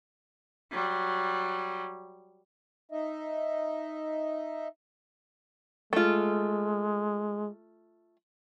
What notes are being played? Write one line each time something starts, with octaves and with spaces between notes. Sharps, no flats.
F#3 G3
D#4 D#5 E5
G#3 A3 F4